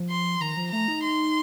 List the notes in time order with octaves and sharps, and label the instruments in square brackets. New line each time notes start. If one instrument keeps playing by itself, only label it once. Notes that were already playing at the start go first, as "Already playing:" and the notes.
Already playing: [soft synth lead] F3
[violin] C6
[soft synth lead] D#3 [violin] A#5
[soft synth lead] F3
[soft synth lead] A3 [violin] A#5
[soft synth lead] D#4
[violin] C6